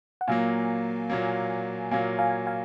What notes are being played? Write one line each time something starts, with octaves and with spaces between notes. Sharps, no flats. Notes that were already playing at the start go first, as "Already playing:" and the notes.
F#5
A#2 F#3 A#3 F5 G#5
A#2 F#3 A#3
A#2 F#3 A#3 F5 G#5
F5 G#5
F5 G#5